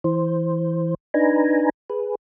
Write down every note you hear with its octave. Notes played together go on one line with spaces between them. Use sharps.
E3 C5
D4 D#4 B4 G#5 A#5
G#4 B4